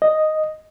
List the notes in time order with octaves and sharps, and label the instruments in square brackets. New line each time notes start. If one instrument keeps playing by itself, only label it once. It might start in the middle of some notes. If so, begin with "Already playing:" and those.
[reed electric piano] D#5